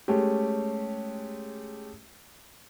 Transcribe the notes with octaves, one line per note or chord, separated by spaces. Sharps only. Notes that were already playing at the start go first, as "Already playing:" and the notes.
G#3 A3 C#4 G4